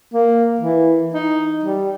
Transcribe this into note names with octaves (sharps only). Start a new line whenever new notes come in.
A#3
E3
D#4
G3